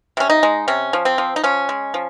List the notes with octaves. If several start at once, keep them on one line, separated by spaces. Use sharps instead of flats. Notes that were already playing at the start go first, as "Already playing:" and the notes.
C3 C#4
D#4
G#3
C3 C#4
F3
C4
F3
D#4
F3 C#4
G#3
F3